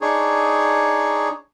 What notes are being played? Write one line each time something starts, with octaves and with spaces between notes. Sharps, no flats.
D4 D#4 G#4 C#5